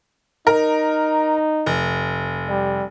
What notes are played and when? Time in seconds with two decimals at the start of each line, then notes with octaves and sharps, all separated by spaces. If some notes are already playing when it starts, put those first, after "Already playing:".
0.47 D#4 A#4
1.66 F1
2.49 G3